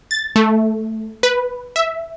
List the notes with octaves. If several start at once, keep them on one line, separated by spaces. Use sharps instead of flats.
A6
A3
B4
E5